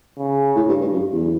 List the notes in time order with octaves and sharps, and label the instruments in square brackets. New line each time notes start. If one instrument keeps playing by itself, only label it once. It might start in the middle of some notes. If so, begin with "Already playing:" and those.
[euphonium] C#3
[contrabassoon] A2
G2
G2
F#2
E2